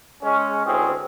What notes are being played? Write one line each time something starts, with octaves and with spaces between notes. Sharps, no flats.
G#3 C#4
D2 E3 C4 C#4 G#4